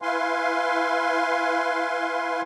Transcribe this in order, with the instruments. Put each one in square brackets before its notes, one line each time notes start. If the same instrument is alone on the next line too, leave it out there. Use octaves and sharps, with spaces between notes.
[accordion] E4 B4 F5 G#5 C6